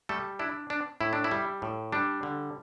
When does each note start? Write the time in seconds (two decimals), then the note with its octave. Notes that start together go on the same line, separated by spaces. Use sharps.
0.09 G3 A3 A4
0.39 D4 E4
0.70 D4
1.01 A2 E4
1.13 D4
1.24 E4
1.31 G3
1.62 A2
1.92 G3 D4
2.23 D3